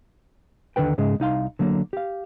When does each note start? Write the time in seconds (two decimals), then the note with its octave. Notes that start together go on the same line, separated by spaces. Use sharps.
0.76 D#2 D3 F3 B4 G5
0.98 G#2 C#3 G#3
1.20 C2 D#4 F5 C6
1.59 D3 F#3 A#3
1.93 G4 F5